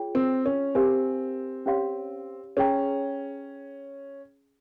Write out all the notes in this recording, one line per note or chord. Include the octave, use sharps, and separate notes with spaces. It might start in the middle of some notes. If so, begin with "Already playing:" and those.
Already playing: F4 G#4 C#5 G5
C4
C#4
C4 G4 A#4 F5 G#5
C#4 G4 C#5 F5 C6
C#4 G#4 C#5 G5 A#5